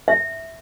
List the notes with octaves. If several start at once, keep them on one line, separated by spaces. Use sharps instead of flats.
E5